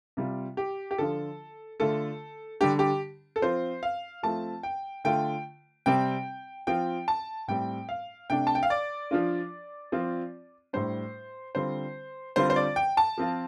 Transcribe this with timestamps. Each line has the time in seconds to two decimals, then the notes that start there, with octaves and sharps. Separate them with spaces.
0.17 C3 G3 F4
0.57 G4
0.91 G4
0.98 D3 F3 D4 F4 A4
1.80 D3 A3 F4 A4
2.61 D3 G3 D4 G4
2.79 G4
3.36 A4
3.42 F3 C4 F4 C5
3.83 F5
4.23 F3 A3 C4 F4 A5
4.63 G5
5.04 D3 A3 F4 G5
5.86 C3 G3 C4 G5
6.67 F3 C4 F4 G5
7.08 A5
7.48 A2 G3 C4 G5
7.89 F5
8.30 C3 A3 D4 G5
8.47 A5
8.55 G5
8.63 F5
8.70 D5
9.11 F3 D4 F4
9.92 F3 C4 F4
10.73 A2 G3 D4 C5
11.55 D3 G3 C4 F4 C5
12.36 D3 G3 C4 F4 C5
12.50 C5
12.56 D5
12.76 G5
12.97 A5
13.18 F3 C4 F4